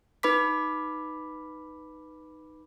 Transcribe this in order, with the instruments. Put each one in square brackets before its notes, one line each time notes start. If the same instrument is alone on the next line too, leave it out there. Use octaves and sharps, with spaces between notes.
[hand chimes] D#4 B4 B5 D6 B6